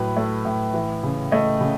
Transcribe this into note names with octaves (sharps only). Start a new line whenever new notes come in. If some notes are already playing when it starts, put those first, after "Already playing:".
Already playing: A2 F#3 B4
A3
A2
E3
C#3
A3 D#5
C#3